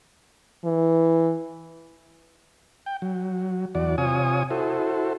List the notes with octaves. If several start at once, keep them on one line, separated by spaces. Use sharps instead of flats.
E3
G5
F#3
E2 F#4 D5
C3 F4 C#5 G#5 D#6
E4 F#4 A4 C5